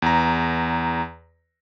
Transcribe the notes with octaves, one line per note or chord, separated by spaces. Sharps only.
E2 A#5